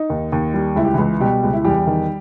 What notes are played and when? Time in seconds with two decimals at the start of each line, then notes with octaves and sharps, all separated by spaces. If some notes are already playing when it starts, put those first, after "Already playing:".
Already playing: D#4
0.10 D#2
0.32 D#2
0.54 G3
0.76 C#2 E4
0.85 G4
0.94 C#2 E3 E4
1.20 B2 G3 G4
1.43 C#2
1.53 E4
1.65 E2 G3 G4
1.87 D#3